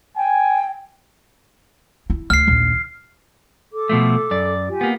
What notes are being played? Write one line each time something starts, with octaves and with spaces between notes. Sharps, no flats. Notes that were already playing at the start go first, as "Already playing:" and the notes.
G5 G#5
E4
D2 F6 C7
A#1 D#2
A4 D6
B2 F3 A3
F#2 D5
F4 G4 G#5
A#3 B3